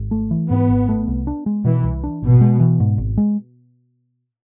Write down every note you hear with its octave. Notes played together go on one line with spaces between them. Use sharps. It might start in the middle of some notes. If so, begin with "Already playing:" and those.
Already playing: G#1
A3
E3
G#2 B3
G#1
A3
C2
D4
G#3
B2 E3
C2
D4
G#1 B2
G#3
E3
G#2
G#1
G#3